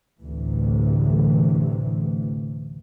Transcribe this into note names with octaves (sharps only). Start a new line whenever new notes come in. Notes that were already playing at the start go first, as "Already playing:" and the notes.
A1 D2 C3 E3